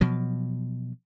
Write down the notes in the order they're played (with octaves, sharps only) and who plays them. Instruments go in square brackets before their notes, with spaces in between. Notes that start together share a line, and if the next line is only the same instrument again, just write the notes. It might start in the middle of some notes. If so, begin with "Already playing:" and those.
[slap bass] B2 F3 F#3